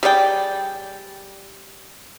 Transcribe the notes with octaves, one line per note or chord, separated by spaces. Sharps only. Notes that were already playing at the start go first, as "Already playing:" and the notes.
G3 G#4 D5 G5